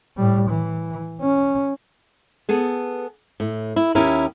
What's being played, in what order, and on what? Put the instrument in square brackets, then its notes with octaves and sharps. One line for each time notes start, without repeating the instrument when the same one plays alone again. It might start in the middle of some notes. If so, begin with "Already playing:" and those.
[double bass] A2 G3
E3
C#4
[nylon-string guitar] B3 G#4 A4
A2
E4
D#2 C#4 E4 G4 A#4